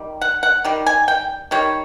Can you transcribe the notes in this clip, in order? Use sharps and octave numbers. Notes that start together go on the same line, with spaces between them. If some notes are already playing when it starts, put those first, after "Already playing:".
Already playing: D#3 G3
F#5
F#5
D#3 G3
G#5
G5
D#3 G3 C#5